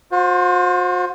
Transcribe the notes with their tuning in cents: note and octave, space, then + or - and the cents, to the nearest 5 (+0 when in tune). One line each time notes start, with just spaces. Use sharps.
F#4 -45 C5 +10